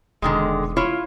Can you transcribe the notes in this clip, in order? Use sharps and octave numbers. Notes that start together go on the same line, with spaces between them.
E1 D3 D#3 G#3
E4 F4 C#5